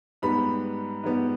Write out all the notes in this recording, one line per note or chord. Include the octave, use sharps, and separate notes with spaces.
G#2 G3 B3 B5
G#2 G3 B3